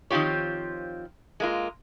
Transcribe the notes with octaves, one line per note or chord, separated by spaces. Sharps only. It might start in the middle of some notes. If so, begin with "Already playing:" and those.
D#3 F3 C4 F4 G4 C#5
G#3 A#3 F4